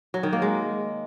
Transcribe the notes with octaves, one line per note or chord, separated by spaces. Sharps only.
F#3
D#3
A#3
G#3